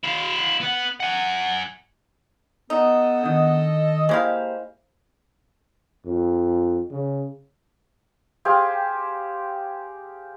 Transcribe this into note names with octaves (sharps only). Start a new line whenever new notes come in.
E4 F5
B3 F#5
F#5 G#5
B3 D#4 A4 D#5
D3 D#3
G#3 A#3 E4 G4 C5 F5
F2
C#3
G4 G#4 C5 F5